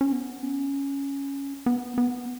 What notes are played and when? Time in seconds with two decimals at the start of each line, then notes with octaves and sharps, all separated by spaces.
0.01 C#4
0.12 B3
0.43 C#4
1.66 B3
1.98 B3